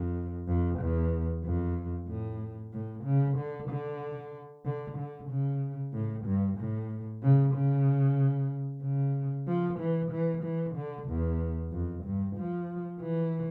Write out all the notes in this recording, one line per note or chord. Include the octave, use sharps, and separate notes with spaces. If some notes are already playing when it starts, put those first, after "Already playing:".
Already playing: F2
F2
E2
F2
A2
A2
C#3
D3
D3
D3
D3
C#3
A2
G2
A2
C#3
C#3
C#3
F3
E3
E3
E3
D3
E2
F2
G2
F3
E3